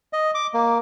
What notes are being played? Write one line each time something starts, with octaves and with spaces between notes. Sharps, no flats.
D#5
D6
A#3